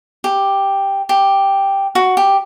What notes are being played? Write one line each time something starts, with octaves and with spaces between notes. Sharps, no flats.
G4
G4
F#4
G4